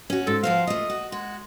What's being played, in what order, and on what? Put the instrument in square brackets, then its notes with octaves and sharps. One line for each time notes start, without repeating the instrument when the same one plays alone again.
[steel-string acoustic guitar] C#4 F#4
[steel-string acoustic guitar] G#2 [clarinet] A4
[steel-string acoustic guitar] F3 F#4 C5 [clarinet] F5
[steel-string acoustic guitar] A3 F4 [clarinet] D#5
[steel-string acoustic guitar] F#4
[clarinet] G#3 [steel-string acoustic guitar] F#4